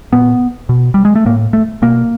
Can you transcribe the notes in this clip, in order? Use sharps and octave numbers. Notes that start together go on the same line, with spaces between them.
A#2 B3
B2
G3
G#3
A3
A2 A#3
A3
B2 A#3